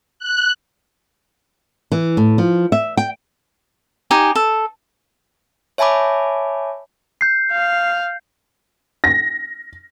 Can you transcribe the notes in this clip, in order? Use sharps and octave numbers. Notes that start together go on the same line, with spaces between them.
F#6
E3
A2
F3
E5
G5
D#4 G4 G#5
A4
C#5 E5 G#5 A5 B5 D6
G6 C7
F5
A#6